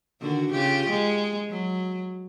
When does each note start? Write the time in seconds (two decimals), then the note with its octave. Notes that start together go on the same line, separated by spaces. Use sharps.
0.21 D3 D#3 F#4
0.52 C#3 F4 G4
0.90 G#3
1.49 F#3